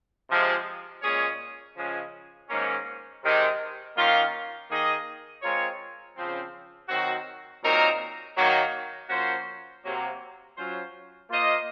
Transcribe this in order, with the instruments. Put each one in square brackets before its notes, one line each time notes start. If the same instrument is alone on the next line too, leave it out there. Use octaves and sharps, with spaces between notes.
[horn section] C3 F3 G#3
A#2 G#3 C#4 G#4 C#5
C#3 F3 G#3 C#4
G#2 D#3 A#3 C#4
C3 D#3 G#3
D#3 A#3 C#4 F4
D#3 A#3 D#4 G#4 D#5
G#3 C4 F4 A#4 C#5
C#3 F3 C4
D#3 F#3 C4 F#4
A#2 F#3 C4 D#4 A#4
D#3 F#3 A#3
F3 A#3 C#4 F#4 C5
C3 F#3 A#3
F#3 C#4 F4 C5
A#3 F4 C5 D#5